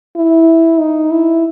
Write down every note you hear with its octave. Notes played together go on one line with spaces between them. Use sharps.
E4
D#4
E4